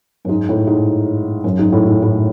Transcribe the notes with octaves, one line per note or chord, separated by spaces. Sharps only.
F#2
G#2
A2
G#2
F#2
G#2
A2
G#2
A2